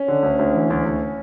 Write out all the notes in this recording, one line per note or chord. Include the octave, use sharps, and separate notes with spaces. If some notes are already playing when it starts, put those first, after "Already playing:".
Already playing: C#4
D3
D2
D2
E3
D2
D2